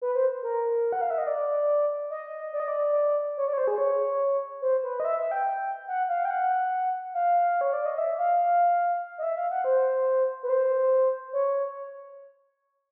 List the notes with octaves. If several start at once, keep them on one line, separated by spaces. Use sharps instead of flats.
B4
C5
A#4
F#5
F5
E5
D#5
D5
D#5
D5
D#5
D5
C#5
D5
C#5
C5
G#4
C#5
C5
B4
D#5
E5
E5
G5
F#5
F5
G5
F#5
F5
C#5
D5
D#5
E5
F5
D#5
E5
F5
F#5
C5
B4
C5
C#5